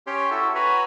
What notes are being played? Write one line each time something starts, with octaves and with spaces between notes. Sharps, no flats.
C#4 G4 C#5 G5 C6
E4 F#4 A4
F#4 B4 C#5 G#5 A#5 B5